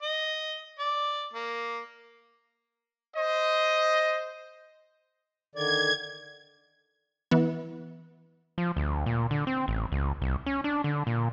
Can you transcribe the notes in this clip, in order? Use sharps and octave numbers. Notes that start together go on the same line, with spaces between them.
D#5
D5
A#3
C5 D#5
D3 D#3 D5 G#6
E3 B3
F3
D2
A#2
D3
C4
A1
C#2
C2
C#4
D4
D3
A#2